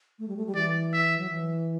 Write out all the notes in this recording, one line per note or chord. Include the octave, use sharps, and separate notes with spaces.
A3
G3
A3
G3
E3 D5
E5
F#3
E3